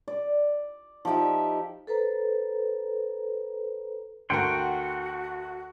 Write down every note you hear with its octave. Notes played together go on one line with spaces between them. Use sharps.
D5
F3 D#4 G4 E5
A4 B4 C5 A#5
D2 F#4 A#4 F#5 G5 C6